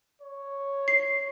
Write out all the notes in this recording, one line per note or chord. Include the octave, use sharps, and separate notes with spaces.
C#5
C7